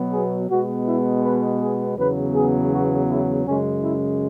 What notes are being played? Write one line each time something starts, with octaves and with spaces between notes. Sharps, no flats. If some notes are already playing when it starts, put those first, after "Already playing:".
Already playing: B2 F#3 B3
G#4
B2 G#3 B3 F#4
E4
B4
G#4
E2 C#3 F#3 B3 B4
G#4
F#4
E4
F#2 C#3 G#3 C#4
E4